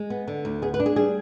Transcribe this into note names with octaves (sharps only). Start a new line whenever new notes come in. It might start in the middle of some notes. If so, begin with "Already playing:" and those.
Already playing: G#3
B3
D3
D2
B3 G#4
B4
D4
G#4
G3 G#4